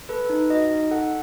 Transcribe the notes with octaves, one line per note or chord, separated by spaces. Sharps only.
A4 B4
D#4
F#4 D#5
D#4
A4 F#5